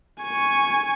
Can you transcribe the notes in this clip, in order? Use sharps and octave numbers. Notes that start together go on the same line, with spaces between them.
G#5 C#6